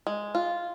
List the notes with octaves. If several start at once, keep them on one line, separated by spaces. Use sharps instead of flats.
G#3
F4